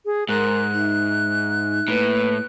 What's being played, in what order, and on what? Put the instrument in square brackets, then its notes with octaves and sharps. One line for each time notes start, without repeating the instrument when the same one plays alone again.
[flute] G#4
[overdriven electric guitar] G#2 [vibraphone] A#4 A#5 C6 [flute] F#6
[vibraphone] D#4 E5
[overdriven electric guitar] A2 [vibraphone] A#3 B4